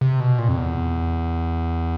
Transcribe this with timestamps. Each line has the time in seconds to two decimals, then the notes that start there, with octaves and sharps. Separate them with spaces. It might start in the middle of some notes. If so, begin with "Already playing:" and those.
0.01 C3
0.20 B2
0.39 A#2
0.48 F2
0.57 E2